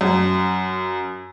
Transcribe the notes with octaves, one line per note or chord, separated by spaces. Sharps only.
F#2